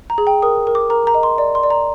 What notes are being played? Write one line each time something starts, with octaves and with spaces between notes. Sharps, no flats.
A#5
G#4
G5
A#4 D#6
A#4
D6
A#4 A#5
A#5
D#5
C6
D5
C6
D5
A#5